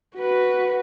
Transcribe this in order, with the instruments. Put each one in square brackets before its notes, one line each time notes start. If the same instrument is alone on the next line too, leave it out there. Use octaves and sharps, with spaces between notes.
[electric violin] F#4 B4